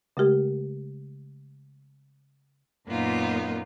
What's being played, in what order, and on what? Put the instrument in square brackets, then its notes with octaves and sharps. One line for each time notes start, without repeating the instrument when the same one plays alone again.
[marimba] C#3 G#3 A3 G4 A#4
[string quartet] F#2 A#2 A#3 B3 D#4 F4